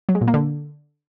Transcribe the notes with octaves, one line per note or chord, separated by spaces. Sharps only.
F#3
G#3
A#2
A#3
D3